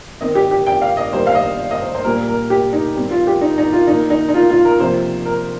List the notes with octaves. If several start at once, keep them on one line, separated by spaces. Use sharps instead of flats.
D#3 C4 D#5
G4
G4
G5
F5
D#5
D#3 G3 A#3 C5
F5
D#5
D#5
C5
C5
A#2 G3 A#3 A#4
A#4
G4
D#4
D#3 G3 C4
F4
G4
D#4
D#4
F4
D#3 A#3 D#4
D#4
D#4
F4
F4
A#4
C3 F3 A#3 C5
A#4